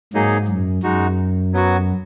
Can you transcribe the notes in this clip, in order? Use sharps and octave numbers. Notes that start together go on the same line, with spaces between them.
G#2 F#3 A#3 D#4 G#4 D#5
F#2
F#2 G#3 D#4 F#4
F#3 B3 F#4